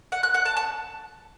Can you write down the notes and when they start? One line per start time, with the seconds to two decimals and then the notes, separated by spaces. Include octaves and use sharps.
0.12 F#5
0.23 F#6
0.34 F#5
0.45 A5
0.57 A5